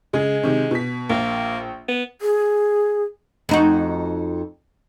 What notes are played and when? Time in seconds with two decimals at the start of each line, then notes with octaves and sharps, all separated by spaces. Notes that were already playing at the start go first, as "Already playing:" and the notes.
0.13 C#3 G#3 G#4
0.43 C3 D#3
0.71 B2 B6
1.09 A#1 A#3
1.88 B3
2.21 G#4
3.49 F2 D#4 F#4